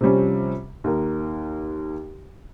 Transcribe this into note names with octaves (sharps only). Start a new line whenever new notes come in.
C3 F3 G3 C#4
D#2 A#4